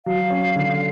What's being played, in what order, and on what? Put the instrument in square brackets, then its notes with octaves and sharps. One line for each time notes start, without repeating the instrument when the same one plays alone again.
[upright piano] F#3 [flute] F5
[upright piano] C#4
D3